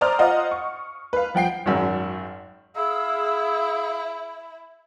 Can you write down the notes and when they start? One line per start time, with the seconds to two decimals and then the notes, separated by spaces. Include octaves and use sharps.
0.01 C5 D5 A#5 D#6 F6
0.19 F4 C5 D#5 F5 F#5
0.51 C#6
1.13 B4 F5
1.35 F3 F#5 G5 C7
1.66 G#1 F#2
2.76 E4 G#4 F5 E6